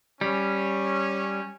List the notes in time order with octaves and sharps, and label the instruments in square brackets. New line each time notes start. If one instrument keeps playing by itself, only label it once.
[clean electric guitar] G3 [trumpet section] C#4